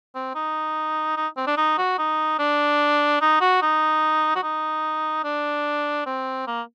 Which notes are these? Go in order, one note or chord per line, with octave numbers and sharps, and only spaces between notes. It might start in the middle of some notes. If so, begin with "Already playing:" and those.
C4
D#4
D#4
C4
D4
D#4
F#4
D#4
D4
D#4
F#4
D#4
F#4
D#4
D4
C4
A#3